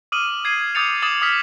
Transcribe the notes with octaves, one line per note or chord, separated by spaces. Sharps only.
D6 D#6 F6 D#7 F#7
G#6 C7 D#7
D6 D#6 G6 A6 C#7 F7
D6 D#6 A6 E7 F#7
D6 D#6 F6 B6